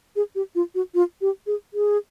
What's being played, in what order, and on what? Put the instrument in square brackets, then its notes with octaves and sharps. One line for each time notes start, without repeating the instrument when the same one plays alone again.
[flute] G#4
G4
F4
F#4
F4
G4
G#4
G#4